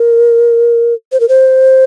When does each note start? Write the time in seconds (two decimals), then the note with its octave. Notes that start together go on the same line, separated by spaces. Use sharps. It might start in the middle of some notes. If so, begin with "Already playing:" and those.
Already playing: A#4
1.12 C5
1.20 A#4
1.29 C5